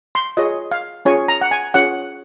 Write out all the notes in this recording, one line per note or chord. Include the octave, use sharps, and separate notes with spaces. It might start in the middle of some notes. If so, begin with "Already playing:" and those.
C6
F4 G#4 C#5 D#5
F5
C#4 F4 G#4 C#5 G#5
A#5
F#5
G#5
C#4 F4 G#4 C#5 F#5